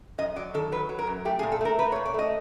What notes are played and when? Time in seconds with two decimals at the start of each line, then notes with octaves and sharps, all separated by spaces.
0.18 F#2 D#5
0.36 F#3 D5
0.54 D#3 A4
0.72 F#3 B4
0.89 F#3
0.99 A#4
1.07 F#2
1.25 A3 G4
1.39 G#4
1.43 A#2
1.52 A4
1.61 A3 A#4
1.79 A3 B4
1.92 C#5
1.96 A#2
2.05 D5
2.14 A3 D#5